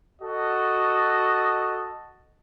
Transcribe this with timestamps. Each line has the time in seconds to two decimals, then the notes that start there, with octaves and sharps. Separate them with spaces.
0.22 F#4 A4 D#5